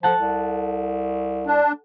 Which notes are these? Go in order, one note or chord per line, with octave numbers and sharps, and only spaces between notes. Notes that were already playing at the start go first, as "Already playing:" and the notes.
F3 A4 F#5 A5
C2
D4